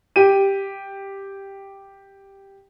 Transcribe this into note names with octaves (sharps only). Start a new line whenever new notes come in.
G4 D#7